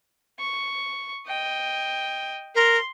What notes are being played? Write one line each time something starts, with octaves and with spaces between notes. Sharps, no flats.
C#6
D#5 G5
A#4 C6